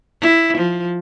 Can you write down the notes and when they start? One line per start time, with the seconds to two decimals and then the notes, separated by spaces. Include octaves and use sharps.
0.21 E4
0.57 F3